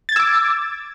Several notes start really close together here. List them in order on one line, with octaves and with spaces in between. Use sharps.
A6 G#6 E6 D6